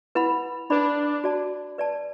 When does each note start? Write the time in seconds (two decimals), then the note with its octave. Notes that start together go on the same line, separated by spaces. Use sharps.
0.15 E4 B4 F#5 B5
0.70 D4 B4 D5 B5
1.24 F#4 D5 A5
1.78 B4 D5 A5